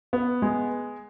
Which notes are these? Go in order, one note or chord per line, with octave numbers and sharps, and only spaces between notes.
B3
G#3